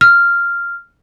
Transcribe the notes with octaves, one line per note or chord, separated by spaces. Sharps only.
F6